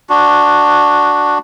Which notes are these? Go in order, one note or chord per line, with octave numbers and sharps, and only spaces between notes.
D4 F#4